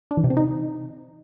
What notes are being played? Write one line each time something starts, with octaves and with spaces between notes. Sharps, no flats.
D4
E3
C3
C4
D#4